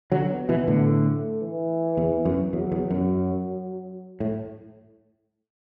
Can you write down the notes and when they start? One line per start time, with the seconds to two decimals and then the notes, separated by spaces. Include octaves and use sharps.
0.12 D3 F#3
0.30 B3
0.49 B2 E3
0.68 A2 D3
0.86 A3
1.42 E3
1.97 E2
2.25 F#2
2.53 E2 F#3
2.72 E2
2.91 F#2
4.20 A2